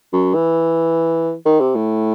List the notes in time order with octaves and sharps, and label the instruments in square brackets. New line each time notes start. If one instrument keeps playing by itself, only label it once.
[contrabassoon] F#2
E3
D#3
C3
A2